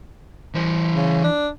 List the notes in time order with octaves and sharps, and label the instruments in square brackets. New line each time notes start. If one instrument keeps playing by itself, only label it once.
[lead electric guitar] E3 C5
[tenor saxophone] C#3
D4